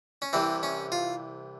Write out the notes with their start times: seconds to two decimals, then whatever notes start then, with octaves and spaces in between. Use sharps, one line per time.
0.22 C#4
0.33 C2 C3 E3 C4
0.63 C#4
0.92 F4